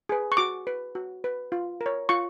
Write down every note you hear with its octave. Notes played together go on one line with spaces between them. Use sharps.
G#4 B4
C#6
F#4 D6
B4
F#4
B4
F4
A#4
C#5
F4 C#6